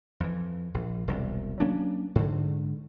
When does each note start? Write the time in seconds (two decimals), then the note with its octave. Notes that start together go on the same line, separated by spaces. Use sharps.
0.20 F2 E3
0.74 A#1
1.08 E1 C2
1.60 F#3 A#3 C#4 D4
2.15 G#2 D3